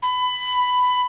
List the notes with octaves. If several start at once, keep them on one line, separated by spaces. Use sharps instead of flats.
B5